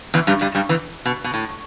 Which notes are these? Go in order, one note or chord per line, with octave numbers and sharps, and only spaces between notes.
E2 E3
G2 G3
G2 G3
G2 G3
E2 E3
B2
B2
A2